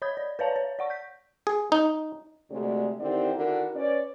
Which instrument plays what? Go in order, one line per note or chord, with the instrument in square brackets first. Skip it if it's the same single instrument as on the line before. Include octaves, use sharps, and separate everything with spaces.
[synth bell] C#5 D#5 B5 D#6 G6 G#6
D5
B4 C#5 D5 F5 A5 A#5
C#5
D5 F#5 C#6
G6 B6
[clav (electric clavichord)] G#4
D#4
[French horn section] D2 C3 G#3 A3 D5
D3 D#3 C4 E4 G4 D5
D3 D#3 E4 F#4 A#4
C#4 B4 C#5 D5